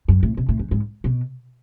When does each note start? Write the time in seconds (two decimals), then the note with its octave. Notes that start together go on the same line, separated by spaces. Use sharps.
0.08 F#2
0.23 A2
0.37 B2
0.48 A2
0.59 F#2
0.71 G#2
1.04 B2